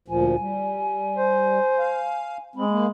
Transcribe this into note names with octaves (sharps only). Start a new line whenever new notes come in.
D2 A#2 F3 G#5
G3
C5
F5
G#3 C4 B5
A#3